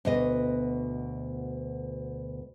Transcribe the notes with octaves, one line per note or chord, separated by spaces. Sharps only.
D2 B2 D#5